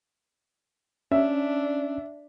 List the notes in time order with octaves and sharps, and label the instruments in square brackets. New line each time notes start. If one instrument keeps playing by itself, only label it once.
[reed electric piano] C#4 [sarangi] D4 [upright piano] E5